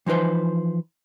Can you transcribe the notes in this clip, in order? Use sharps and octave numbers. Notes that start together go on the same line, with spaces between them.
E3 F3 D#4 B4 C5